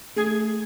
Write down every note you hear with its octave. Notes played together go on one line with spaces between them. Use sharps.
A3 G#4